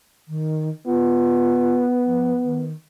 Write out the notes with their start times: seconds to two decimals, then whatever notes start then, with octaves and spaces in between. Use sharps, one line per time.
0.28 D#3
0.86 B3 F4
2.06 F3
2.44 D#3